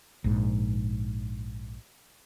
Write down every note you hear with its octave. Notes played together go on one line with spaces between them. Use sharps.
A#1 G#2